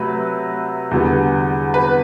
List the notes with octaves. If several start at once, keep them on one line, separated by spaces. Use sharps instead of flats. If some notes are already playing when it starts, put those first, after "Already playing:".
Already playing: C3 F#3 A3 B4
E2 D3 G3 B3
B4